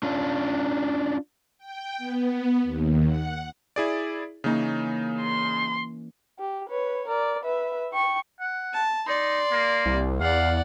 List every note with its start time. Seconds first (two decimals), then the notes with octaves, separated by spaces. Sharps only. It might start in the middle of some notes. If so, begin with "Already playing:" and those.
0.03 C#4 D4 F4
1.58 G5
1.98 B3
2.64 D#2
3.07 F#5
3.76 E4 G#4 D5
4.44 C#3 E3 A#3 C#4 D#4
5.22 C6
6.39 G4
6.69 B4 C#5
7.08 A#4 D5
7.43 B4 E5
7.92 G5 C#6
8.40 F#5
8.73 A5
9.07 D#4 D5 C6
9.52 A#3
9.86 C2
10.20 E2 D5 F5 F#5